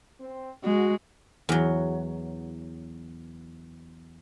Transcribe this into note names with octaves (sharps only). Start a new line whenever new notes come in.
C4
G#3 F#4
E2 F#3